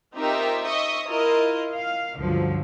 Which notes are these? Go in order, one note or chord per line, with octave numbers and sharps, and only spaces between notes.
C4 D#4 F4 G4 A#4 E5
D#5 E5 C#6 D#6
E4 F4 A#4 D#5
F5
C#2 G2 D3 F3 F#3